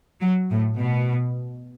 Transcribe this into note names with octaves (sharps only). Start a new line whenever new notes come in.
F#3
A2
B2